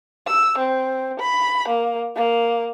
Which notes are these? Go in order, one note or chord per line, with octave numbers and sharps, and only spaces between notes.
E6
C4
B5
A#3
A#3